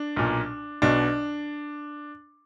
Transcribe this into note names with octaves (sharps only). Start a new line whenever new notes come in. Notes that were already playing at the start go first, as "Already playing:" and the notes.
Already playing: D4
B1 A#2
B1 B2 D4